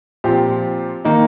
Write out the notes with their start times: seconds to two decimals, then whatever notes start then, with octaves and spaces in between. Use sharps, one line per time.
0.24 A#2 F3 C4 G4
1.04 D#3 A#3 D#4